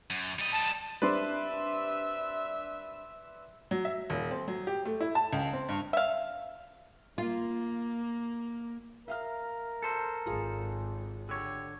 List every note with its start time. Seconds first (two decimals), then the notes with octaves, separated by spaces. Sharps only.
0.10 F#2
0.39 G3 D#5
0.53 A5
1.02 G3 C4 D4 B4 D5 E5 C6
3.71 F#3
3.85 E5
4.10 D#1
4.31 C4
4.48 F#3
4.67 G4
4.85 A3
5.01 E4
5.15 A5
5.33 C#2
5.53 C4
5.69 G2
5.93 E5 F5
7.18 A#3 F4
9.08 A#4 E5 F5 F6
9.83 A4 C5
10.26 G#1 F4 G#4
11.29 D3 G4 C#5